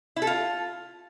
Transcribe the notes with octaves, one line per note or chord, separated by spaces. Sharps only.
E4
A4
F4